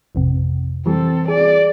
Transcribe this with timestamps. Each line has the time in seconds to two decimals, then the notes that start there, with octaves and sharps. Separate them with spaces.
0.15 A1 F2 C3
0.86 E3 G3 C4 A4
1.28 G#4 D5